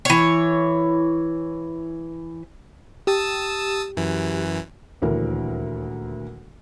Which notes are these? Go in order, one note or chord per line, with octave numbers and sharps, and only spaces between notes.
E3 C#5
G4 A5 D#6 E6
F#2 E3
D#1 D2 E3 A#4